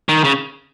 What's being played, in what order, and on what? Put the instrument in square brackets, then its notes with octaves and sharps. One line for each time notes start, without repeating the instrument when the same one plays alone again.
[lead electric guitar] D#3
C#3